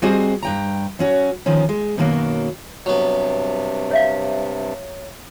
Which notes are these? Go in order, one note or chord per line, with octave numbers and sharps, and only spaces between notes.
G3 C4 F#4 G#4 C5 D#5
G2 G5 A#5
F#3 C#4 F#4
D#3 F3 C#4
G#3
F#2 B2 D#3 F#3 A#3
G2 C3 F#3 B3
C#5 E5 F5